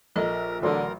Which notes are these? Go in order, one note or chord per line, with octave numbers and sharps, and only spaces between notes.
A#1 A4 A#4 D#5
A1 D3 F#3 A#4 C6